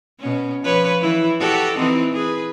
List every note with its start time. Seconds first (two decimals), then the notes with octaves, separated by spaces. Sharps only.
0.19 B2 C#4
0.63 F3 B4 C#5
1.01 E3 E4
1.40 F#4 G4 A4
1.77 E3 C4 D#4
2.14 G#4 B4